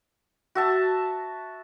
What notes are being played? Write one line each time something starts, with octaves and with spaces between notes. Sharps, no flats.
F#4 E5 A5